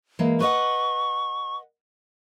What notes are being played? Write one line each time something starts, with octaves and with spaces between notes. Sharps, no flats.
E3 G#3 A#3
B4 D#5 F#5 C#6